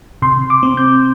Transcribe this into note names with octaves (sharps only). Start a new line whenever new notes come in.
C3 C6
D6
C4
G6